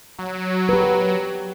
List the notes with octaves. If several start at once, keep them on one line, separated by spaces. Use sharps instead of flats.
F#3
G4 B4